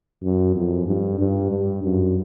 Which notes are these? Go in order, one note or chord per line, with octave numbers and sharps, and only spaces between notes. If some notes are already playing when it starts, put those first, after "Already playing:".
F#2
F2
G2
G2
G2
F#2